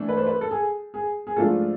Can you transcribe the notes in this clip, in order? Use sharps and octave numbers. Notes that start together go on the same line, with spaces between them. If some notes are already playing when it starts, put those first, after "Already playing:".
Already playing: E3 A3 D4
B4
C5
B4
A4
G#4
G#4
G#4
G#2 F3 A3 D4 F4 A4